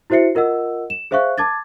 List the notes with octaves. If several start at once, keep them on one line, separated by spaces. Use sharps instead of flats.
E4 F#4 C5 E5 C7 C#7
F4 A#4 D#5 F#5 E6
E7
G#4 C5 E5 F5 C#6 F#6
A5 D6 G#6 A6